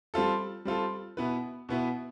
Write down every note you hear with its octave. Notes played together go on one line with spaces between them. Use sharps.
G3 C4 F4 A4
G3 C4 F4 A4
B2 B3 E4 B4
B2 B3 E4 B4